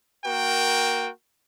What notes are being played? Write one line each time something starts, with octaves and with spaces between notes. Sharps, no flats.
A#3 F#4 A#4 G5